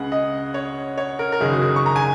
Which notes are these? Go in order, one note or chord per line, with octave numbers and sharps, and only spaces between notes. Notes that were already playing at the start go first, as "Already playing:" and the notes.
Already playing: C#2 C#3 G#3 F#5
D#5
C#5
C#5
A#4
A#4
F#1 F#2 D#3 G#4
F#4
G#4
C#6
A#5
G#5